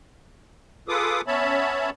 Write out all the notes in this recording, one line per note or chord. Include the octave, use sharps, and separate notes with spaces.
F4 G#4 A4 B4 D6 D#6
B3 C#4 C#5 E5 A5 B5